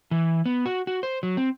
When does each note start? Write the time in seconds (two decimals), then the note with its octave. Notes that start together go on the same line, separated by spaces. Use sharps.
0.11 E3
0.46 B3
0.66 F#4
0.87 F#4
1.03 C5
1.23 F#3
1.37 C4